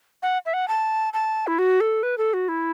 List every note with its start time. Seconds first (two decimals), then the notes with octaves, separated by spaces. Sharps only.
0.22 F#5
0.46 E5
0.53 F#5
0.68 A5
1.13 A5
1.47 E4
1.59 F#4
1.80 A4
2.03 B4
2.18 A4
2.34 F#4
2.48 E4